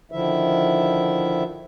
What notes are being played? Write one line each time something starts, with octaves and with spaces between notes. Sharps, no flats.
D3 D#3 F3 E4 E5